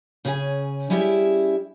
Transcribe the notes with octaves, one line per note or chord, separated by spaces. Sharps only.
C#3 C#4 G#4 F5 G#5
G3 C#4 E4 G4 G#4 E5